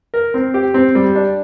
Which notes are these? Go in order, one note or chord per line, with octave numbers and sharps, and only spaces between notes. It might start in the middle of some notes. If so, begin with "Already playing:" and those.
A#4
C4
G4
C4
G3
D4